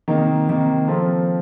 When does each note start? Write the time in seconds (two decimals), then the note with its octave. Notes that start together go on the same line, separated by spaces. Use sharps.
0.08 C3 D#3 A#3 D#4
0.48 C3 D#3 A#3
0.88 F3 C4 F4 A4